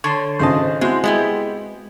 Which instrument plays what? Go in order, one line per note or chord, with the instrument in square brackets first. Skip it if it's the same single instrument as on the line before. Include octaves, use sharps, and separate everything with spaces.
[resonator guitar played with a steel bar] D3 [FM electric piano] C#5 A5 C6
[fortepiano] G#1 C#3 A5 [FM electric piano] C5 D#5
[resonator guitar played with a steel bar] G#3 [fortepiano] C4 F#4 [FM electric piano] E4 C5
[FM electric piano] G#3 [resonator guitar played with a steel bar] B3 E4 G4